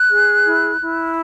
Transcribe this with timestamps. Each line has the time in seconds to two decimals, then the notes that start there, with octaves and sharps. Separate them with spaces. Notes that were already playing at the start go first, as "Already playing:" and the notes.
Already playing: F#6
0.11 G#4
0.46 E4
0.80 E4